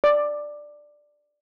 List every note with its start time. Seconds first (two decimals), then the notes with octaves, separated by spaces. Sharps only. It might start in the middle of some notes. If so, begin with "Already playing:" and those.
0.04 D5